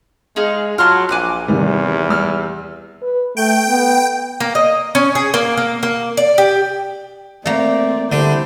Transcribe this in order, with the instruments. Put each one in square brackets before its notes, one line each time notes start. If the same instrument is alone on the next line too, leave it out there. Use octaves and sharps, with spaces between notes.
[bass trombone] G#3 [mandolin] D#4 G#4 F5
[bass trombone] F#3 [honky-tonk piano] F4 [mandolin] A5 C6 F6
[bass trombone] A#1 [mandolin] G#5 D6 F#6
[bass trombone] E2 [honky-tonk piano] C3 D#3 G3
[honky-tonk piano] G3 E6 F6
[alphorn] B4
[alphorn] A3 [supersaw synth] G5
[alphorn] B3
[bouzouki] A#3
D#5
C#4
G#4
A#3
A#3
A#3
D5
G4
[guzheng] A3 A#3 [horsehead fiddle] C4 [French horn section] D5
[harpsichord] D3 [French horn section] G3 E4 [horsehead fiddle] C5